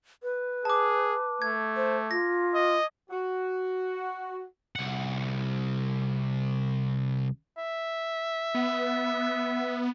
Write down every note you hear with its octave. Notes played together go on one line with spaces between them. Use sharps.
B4
G#4 A5 D6
A3 G#6
C5
F4 A#6
D#5
F#4
C2 F#5
E5
B3